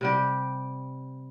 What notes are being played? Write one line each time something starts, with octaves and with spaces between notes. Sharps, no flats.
C3 G3 G4